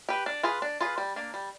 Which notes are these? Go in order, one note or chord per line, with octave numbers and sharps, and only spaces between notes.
G4 B4
D4
F4 G#4 B4
D4
F4 G#4 B4
G3
A#3 D4
G3